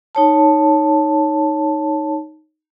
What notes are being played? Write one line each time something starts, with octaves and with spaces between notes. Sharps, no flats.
D#4 C#5 A5